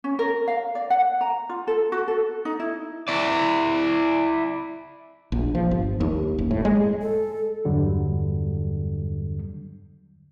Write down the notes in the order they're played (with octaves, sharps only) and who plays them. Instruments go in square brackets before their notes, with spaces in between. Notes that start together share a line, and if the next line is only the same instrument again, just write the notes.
[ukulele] C#4
A#4
F5
D5
F#5
A#5
F4
A4
F#4
A4
D#4
E4
[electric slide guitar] E4 D5
[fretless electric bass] A#1
F3
G1
D#2
F#1
A2
G#3
[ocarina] A4
[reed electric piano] E2 G2 D3 F#3 G3